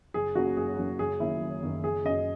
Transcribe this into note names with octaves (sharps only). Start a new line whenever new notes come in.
F#1 G#4
F#2 C#3 F#3 A#3 F#4
F#1 G#4
F#2 C#3 F#3 A#3
F#1 G#4
F#2 D#3 F#3 A#3 E4
F#1
F#2 D#3 F#3 A#3
F#1 G#4
F#2 C#3 D#5